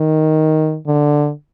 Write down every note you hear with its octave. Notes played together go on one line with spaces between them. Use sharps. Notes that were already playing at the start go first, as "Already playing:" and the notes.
Already playing: D#3
D3